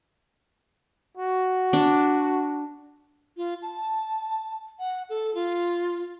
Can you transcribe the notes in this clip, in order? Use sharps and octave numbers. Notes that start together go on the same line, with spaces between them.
F#4
D4
F4
A5
F#5
A4
F4